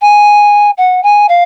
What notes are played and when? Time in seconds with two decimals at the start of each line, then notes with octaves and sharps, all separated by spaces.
0.01 G#5
0.77 F#5
1.03 G#5
1.29 F5